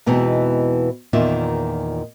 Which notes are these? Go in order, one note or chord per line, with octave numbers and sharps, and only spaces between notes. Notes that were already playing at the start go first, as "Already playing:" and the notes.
E2 B2 E3 G#3 C4 D#4
E2 A#2 D#3 F4 E5